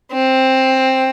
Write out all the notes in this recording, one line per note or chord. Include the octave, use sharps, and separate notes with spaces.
C4